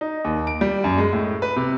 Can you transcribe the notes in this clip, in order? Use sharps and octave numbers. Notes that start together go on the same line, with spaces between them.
D#4
D#2
D7
G3
F#2
G#3
A2
B4
C3